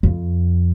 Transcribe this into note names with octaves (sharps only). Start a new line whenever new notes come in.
F2